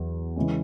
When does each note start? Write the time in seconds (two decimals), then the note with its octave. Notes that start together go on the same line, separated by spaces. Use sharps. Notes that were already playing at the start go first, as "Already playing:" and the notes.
Already playing: E2 F#3
0.36 C#3 E3 G#3 C#4